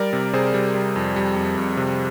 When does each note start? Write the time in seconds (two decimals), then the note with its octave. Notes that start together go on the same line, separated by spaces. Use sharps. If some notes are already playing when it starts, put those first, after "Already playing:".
Already playing: G3 A#4 D5
0.13 C3
0.33 C3 G#4 C5
0.54 G3
0.75 G3
0.96 F2
1.16 G3
1.36 F2
1.58 F2
1.77 C3